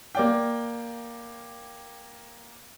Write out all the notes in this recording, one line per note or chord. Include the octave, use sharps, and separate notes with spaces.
A#3 D5 G5